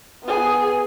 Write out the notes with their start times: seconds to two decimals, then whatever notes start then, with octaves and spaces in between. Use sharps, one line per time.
0.24 B3 G#4